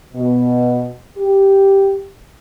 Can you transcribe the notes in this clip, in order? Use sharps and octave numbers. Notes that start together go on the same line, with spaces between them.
B2
G4